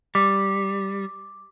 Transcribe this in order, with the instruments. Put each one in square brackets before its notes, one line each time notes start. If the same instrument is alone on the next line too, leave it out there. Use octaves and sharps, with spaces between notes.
[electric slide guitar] G3 [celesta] D6